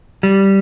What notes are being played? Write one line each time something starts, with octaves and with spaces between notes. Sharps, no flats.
G3